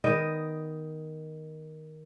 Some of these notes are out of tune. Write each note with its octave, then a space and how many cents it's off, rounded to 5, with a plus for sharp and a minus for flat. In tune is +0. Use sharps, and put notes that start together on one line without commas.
D#3 +5 B3 +10 D#5 +0